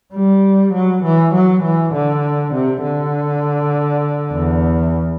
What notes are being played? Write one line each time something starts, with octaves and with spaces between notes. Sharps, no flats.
G3
F#3
E3
F#3
E3
D3
C3
D3
E2